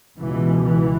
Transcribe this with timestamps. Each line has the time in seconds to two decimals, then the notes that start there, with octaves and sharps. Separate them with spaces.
0.18 C#2 B2 E3
0.65 E3